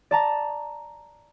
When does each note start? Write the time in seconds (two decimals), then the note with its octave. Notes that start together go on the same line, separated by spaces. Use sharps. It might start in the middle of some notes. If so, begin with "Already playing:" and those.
0.11 D5 A5 A#5